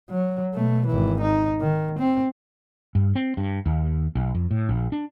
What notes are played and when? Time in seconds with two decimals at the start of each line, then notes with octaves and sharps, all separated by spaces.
0.10 F#3
0.54 B2 A3
0.87 G#1 E3
1.21 D#4
1.61 D#3
1.99 C4
2.95 G2
3.15 C4
3.37 G2
3.66 D#2
4.15 B1
4.35 F2
4.51 A2
4.69 A#1
4.92 D4